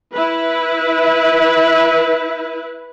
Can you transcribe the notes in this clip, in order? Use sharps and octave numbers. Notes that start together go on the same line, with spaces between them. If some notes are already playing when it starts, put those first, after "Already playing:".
E4 B4